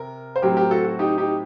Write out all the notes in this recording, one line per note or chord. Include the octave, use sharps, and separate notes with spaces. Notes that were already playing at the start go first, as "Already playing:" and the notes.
Already playing: C3 A#4
C5
A2 F#3 C4 G4 A#4
G4 A#4
F#4 A4
F#4
D#4 G4
D#4 G4